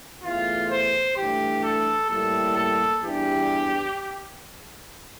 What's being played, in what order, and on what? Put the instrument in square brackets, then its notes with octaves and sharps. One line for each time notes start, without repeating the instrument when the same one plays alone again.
[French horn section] E2 E3 A3 [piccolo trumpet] F4
[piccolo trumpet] C5
[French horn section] G2 E3 A3 D4 [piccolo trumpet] G4
[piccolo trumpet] A4
[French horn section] A2 G3 A#3 E4 [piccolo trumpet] A4
[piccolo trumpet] A4
[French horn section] E2 E3 G3 D4 [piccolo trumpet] G4